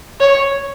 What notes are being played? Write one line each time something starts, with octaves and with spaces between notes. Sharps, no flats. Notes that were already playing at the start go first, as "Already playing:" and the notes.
C#5